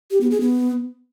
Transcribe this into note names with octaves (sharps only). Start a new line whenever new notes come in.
G4
B3
G#4
B3